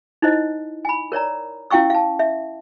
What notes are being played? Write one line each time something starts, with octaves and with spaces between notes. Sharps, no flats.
D#4 E4 C5 D#5
G#5 B5
A#4 C#5 D5 A#5
C#4 E4 F5 G5 C#6 E6
F5 A5
E5